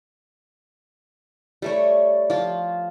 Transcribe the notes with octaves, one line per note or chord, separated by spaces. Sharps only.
G3 A3 C#5
F3 F4